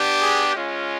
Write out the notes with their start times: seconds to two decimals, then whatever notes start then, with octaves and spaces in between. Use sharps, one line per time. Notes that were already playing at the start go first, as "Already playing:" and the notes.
Already playing: B3 D4 G4
0.20 G#4
0.54 G#3 C#4 F4